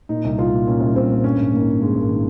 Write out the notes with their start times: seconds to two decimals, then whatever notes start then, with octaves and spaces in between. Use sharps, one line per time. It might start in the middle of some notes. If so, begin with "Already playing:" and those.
0.09 A#2 D#4
0.25 C2
0.38 C2 F4
0.52 A#2
0.67 A#2 C#4
0.81 C2
0.95 C2 C4
1.09 A#2
1.24 G2 C#4
1.38 G#1
1.53 D#3 A#3
1.67 G#1
1.81 G2 G#3
1.95 G#1
2.10 D#3